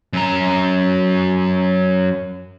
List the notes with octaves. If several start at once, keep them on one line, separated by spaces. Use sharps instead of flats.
F#2 A#5